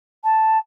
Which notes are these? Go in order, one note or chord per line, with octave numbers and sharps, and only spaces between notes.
A5